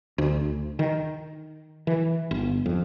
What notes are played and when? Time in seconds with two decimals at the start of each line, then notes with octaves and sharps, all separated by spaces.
0.18 D2
0.79 D#3
1.87 E3
2.31 G1
2.66 F2